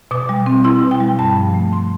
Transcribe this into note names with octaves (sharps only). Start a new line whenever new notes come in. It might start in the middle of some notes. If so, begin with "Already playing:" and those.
B2 D6
G3
C4
E4 C6
B2
G5
G3
G2 A5
F3
A3
C6